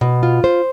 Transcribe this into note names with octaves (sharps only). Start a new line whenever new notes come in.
B2
F4
C5